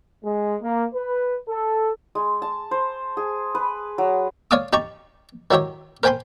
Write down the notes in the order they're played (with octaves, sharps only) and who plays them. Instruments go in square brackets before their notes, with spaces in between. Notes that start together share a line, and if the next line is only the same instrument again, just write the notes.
[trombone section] G#3
A#3
B4
A4
[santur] G#3
A5
C5
G#4
B4
F#3
[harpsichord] C#5 D5 F5 A5 D6 D#6
D#4 G4 A5 A#5 C#6
D#3 F#3 E4 G4 C#5
A#4 C5 G5 G#5 B5 C6